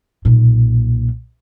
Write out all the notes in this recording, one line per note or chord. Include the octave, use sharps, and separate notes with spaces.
B1 A#2